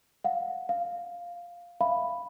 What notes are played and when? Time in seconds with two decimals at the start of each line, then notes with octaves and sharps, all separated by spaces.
0.24 F5 F#5
0.69 F5
1.81 E5 F5 B5